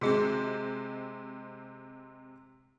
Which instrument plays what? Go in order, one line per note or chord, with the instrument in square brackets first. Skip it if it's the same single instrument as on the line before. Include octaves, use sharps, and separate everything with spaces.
[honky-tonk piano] C3 G#3 C4 [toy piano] F#4 G#4